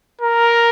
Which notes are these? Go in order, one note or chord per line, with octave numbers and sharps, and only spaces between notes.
A#4